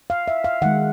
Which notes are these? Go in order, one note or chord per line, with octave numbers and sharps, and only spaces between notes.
F5
E5
F5
D#3 G#3 F#5